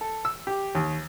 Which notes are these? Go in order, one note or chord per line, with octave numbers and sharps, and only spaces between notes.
A4
E6
G4
D#2